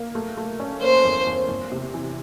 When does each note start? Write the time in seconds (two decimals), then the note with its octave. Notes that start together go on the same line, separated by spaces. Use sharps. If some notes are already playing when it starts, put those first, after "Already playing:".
Already playing: A#3
0.15 A3
0.37 A3
0.60 C#4
0.81 A#3 C5
1.05 E2
1.27 E2
1.49 E2
1.72 C3
1.94 E3